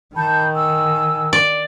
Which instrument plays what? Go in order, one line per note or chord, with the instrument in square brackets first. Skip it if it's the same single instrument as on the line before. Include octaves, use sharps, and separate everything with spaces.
[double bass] D#3 [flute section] A5 B5 G6
[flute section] G#5 E6
[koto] D5